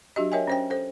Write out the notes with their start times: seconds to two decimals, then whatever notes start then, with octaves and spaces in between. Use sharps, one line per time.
0.16 F#3 D4 F#4 G4 D#5
0.32 A#4 C#5 D#5 E5 G5 G#5
0.47 C#4 C5 G5
0.70 A4 C5